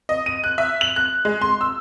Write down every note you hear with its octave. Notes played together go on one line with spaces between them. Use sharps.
D#5
D#7
F#6
E5
F#7
F#6
G#3
C6
E6